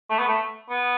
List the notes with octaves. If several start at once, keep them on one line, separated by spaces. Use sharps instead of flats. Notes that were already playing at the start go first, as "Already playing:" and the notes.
A3
B3
A3
B3